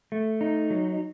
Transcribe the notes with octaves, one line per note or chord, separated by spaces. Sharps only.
A3
D#4
F#3